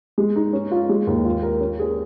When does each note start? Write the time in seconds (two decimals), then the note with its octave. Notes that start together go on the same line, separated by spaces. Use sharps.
0.18 G#3
0.36 D#4
0.53 C#4
0.71 F4
0.89 G#3
1.07 D#2
1.25 F4
1.43 A#4
1.60 C#4
1.79 G#4